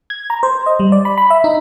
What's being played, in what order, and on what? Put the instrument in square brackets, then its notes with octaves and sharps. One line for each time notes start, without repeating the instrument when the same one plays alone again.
[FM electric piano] G#6
A#5
C5
D#5
G3
D5
B5
B5
E5
D#4